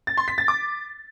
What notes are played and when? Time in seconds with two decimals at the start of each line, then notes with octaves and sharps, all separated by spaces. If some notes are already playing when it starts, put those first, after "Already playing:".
0.07 A6
0.17 C6
0.28 B6
0.38 A6
0.48 D6